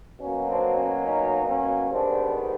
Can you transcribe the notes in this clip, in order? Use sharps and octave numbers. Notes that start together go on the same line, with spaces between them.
B2 F#3 A#3 C#4
C4 D4
C#4
C#4 D#4
C#4
G#2 D#3 G3 B3 C4 D4